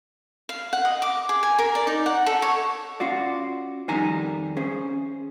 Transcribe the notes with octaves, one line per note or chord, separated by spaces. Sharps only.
F5
F#5
D#5
D6
G#4
G#5
A#4
D5
D#4
F#5
A4
C#5
C#4 F4 F#4 D5
F2 D#3 G3 D#4 G#5 A#5
C#4 G#4 C5